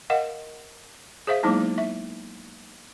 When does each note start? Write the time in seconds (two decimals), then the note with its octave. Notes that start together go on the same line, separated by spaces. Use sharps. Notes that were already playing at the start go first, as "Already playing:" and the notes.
0.10 A#4 D#5 F5 F#5
1.27 G#4 C5 E5 F5
1.43 F#3 G#3 A#3 B3 D#4 E4
1.78 E5